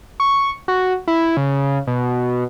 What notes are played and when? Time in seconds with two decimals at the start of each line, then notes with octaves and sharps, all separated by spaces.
0.20 C#6
0.68 F#4
1.08 E4
1.37 C#3
1.87 B2